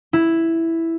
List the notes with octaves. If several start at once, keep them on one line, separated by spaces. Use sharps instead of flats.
E4